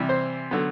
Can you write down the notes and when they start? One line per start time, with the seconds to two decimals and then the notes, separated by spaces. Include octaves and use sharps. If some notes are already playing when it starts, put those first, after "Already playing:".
Already playing: C3 E3 G3
0.09 C5
0.51 D3 F#3 B3